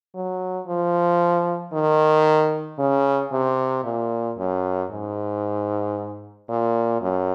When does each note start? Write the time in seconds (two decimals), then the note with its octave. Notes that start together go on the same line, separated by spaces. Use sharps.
0.14 F#3
0.67 F3
1.73 D#3
2.79 C#3
3.32 C3
3.84 A#2
4.38 F#2
4.90 G#2
6.49 A#2
7.02 F#2